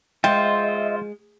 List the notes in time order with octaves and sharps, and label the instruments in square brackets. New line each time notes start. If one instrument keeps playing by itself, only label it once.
[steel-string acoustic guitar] G#3 [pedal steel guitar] F4 C5 [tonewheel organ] D#5 E5 [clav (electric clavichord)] G5